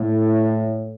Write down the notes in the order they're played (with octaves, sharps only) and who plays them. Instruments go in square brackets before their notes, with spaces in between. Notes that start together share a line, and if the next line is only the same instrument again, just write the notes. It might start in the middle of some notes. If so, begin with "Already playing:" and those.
Already playing: [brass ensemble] A2